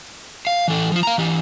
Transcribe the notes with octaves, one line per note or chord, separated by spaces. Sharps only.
F5
E3 A4
F3 F4
F5 A#5
E3 G4